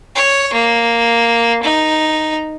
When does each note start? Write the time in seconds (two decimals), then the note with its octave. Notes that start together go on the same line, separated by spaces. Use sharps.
0.15 C#5
0.53 A#3
1.63 D#4